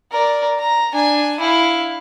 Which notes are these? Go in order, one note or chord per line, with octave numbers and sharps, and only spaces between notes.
A#4 D5
A#5
D4 G#5
E4 F5